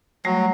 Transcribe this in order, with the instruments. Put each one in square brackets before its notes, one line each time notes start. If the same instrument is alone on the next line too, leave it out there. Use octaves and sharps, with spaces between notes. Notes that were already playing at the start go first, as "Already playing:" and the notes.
[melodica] F#3 [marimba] G3 A3